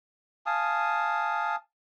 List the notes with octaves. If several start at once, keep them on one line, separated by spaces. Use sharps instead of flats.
F5 G#5 A5 D#6